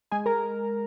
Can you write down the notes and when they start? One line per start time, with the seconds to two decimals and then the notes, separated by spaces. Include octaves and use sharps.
0.12 G#3 G#4 G#5
0.26 A#4 A#5